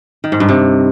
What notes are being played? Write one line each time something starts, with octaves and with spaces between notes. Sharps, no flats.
D#3
G#2
G2
C3